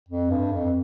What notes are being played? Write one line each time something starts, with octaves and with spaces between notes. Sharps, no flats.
F2
G2
F2